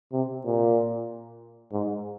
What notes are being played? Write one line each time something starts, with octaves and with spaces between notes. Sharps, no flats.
C3
A#2
G#2